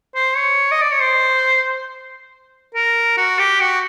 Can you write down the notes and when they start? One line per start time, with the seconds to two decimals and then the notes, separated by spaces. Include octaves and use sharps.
0.15 C5
0.37 C#5
0.71 D#5
0.81 D5
0.91 C#5
1.02 C5
2.74 A#4
3.17 F#4
3.39 G4
3.60 F#4